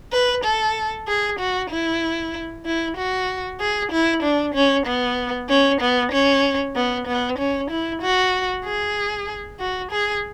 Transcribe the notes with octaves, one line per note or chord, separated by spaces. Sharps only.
B4
A4
G#4
F#4
E4
E4
F#4
G#4
E4
D4
C#4
B3
C#4
B3
C#4
B3
B3
C#4
E4
F#4
G#4
F#4
G#4